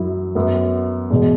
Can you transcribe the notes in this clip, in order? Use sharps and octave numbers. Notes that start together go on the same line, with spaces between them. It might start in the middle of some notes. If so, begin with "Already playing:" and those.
Already playing: F#2 F#3 E4
F#2 F#3 B3
E2 B2 G#3